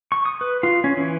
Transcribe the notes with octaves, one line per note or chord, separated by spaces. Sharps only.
C#6
D#6
B4
F4
C#4
E3